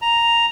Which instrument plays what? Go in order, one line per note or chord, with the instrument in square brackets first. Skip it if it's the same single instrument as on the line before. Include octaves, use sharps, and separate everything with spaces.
[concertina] A#5